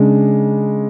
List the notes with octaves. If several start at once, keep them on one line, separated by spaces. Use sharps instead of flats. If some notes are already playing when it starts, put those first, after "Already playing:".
Already playing: C#3 G#3 D4